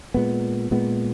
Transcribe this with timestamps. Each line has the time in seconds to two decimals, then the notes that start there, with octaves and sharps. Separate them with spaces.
0.14 A#2 G#3 B3
0.71 A#2 G#3 B3